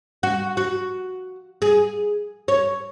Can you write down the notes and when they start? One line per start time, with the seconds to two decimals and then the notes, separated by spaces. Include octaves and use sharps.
0.23 F#4
0.57 F#4
1.62 G#4
2.48 C#5